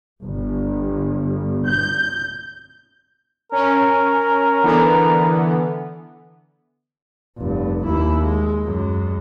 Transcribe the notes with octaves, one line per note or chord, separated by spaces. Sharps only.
G1
G6
C#4 A#4
D3 E3 B3
F1 G2
D#2 E4
G#3
F#2 G#3